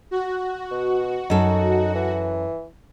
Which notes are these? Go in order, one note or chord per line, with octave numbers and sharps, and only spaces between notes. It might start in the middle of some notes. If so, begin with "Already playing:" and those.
F#4
B2
F#2 D#4 A4
E3